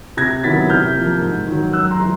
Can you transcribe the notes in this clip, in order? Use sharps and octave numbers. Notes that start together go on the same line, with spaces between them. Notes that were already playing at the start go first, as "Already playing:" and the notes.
C3 G#6 A#6
D#3 F#3 B3 E4 A6 B6
C3 F6 G6
F3 A#3
G#2
D#3 F#3
F#2 E6 F#6
A#5 C6
E3 G3